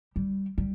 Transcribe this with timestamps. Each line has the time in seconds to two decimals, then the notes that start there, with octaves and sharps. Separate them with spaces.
0.16 G3
0.58 G3